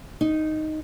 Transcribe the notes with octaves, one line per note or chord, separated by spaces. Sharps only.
D#4